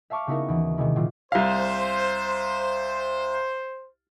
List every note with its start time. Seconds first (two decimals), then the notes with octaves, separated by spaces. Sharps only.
0.10 E5 F5 A5 C#6 D6 F6
0.27 C#3 B3 D#4 E4 F#4 A#4
0.48 D#2 E3
0.78 C3 D#3 G#3 A#3 E4
0.96 A#2 F#3 G3 F4
1.32 C2 C5 F5